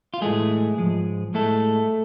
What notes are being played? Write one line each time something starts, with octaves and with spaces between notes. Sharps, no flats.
F4
A2 E3 G#3 A3 G#4
G#2 F3 G#3
A2 G#3 A3 A4